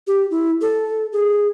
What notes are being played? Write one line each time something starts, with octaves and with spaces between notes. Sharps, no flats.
G4
E4
A4
G#4